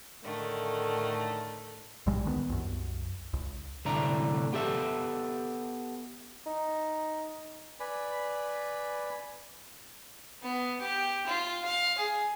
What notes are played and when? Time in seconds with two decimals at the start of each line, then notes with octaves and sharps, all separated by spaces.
0.24 A2 D3 D#3 A3
2.06 B1 A2 G3 G#3
2.24 D2 D#3 G3 B3
2.49 C2 F#2
3.33 C#2
3.86 C2 A2 D3 A3 D5 A#5
4.53 B3 G4 A4 E5
6.46 D#4
7.80 B4 D5 G#5 B5
10.43 B3
10.81 G4
11.27 F4
11.65 F5
11.98 G#4